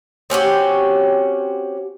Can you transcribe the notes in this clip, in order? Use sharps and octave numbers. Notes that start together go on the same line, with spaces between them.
C4 C#4 F#4 G4